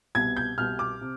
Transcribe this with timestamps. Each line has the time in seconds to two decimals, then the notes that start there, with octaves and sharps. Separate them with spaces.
0.15 C2 B2 B3 G#6
0.37 G6
0.58 C2 B2 B3 F6
0.79 D6
1.01 C3